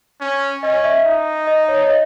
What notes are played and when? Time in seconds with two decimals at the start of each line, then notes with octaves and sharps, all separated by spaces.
0.21 C#4
0.63 C#4 D#5
0.84 E5
1.06 D#4
1.47 D#5
1.68 C#5
1.82 C#5
1.90 D#5